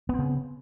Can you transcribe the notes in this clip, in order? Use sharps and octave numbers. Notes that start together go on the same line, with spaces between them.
C#3 B3 C4